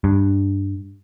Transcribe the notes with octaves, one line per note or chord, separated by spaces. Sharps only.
G2